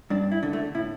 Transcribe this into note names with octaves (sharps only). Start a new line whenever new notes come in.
G2 D4
E4
D3
A3
A2 E4